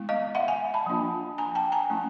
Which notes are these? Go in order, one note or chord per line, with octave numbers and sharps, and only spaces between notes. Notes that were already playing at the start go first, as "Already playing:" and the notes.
Already playing: G#3 B3 E4
D#5 F5
E5 F#5
F#5 G#5
A5 B5
F3 A#3 D4 F4
G#5 A#5
G5 A5
G#5 A#5
F3 A3 C#4 E4